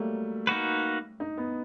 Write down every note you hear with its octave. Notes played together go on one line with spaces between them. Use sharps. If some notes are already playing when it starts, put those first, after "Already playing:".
Already playing: F#3 G3 A3 A#3
A#3 D#4 F#4 B4
D#4
B3